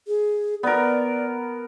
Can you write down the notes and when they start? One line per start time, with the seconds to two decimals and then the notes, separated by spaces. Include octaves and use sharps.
0.08 G#4
0.63 B3 A#4 D5